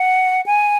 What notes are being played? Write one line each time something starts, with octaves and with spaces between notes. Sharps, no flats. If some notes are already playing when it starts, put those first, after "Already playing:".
Already playing: F#5
G#5